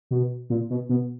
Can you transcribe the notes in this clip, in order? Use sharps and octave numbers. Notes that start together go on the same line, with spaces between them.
B2
A#2
B2
B2